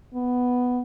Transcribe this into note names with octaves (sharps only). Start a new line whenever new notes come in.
B3